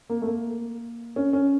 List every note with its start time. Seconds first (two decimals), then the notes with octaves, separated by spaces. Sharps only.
0.10 A#3
0.22 A3
0.27 A#3
1.16 C#4
1.33 C#4